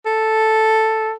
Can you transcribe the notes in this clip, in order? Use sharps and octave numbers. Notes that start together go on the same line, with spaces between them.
A4